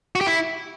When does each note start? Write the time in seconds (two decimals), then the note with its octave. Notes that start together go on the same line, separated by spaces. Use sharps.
0.15 F#4
0.21 G4
0.27 E4